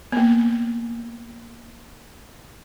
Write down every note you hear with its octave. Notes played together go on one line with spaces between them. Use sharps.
A#3 B3